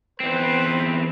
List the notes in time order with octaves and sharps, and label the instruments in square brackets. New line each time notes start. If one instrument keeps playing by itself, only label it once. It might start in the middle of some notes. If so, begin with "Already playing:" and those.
[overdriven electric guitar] E2 C4 [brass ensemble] B4 C5